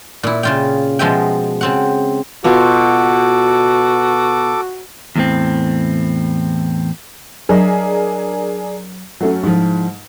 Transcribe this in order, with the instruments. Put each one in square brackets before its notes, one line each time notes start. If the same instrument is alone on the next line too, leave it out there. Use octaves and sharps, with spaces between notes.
[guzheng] A#2 E4
C#3 F4 G5
B2 F3 G#3 E5 G5
C#3 C4 F#5
[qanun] B2 B3 F4 [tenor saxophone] F#4 [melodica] A4 D6
[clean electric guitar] E2 A2 C4
[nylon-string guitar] F#3 D#5 E5 [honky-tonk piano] D4 G#4 A#4
[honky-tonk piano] F#3 A3 C#4
[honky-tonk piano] G#2 [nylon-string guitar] F3 E4